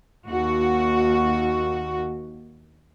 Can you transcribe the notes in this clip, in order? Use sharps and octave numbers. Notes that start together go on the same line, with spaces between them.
D#2 F#4